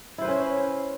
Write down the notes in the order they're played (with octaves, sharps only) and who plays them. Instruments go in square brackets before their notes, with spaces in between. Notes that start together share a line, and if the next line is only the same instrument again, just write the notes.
[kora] E4
C5
B4
C#4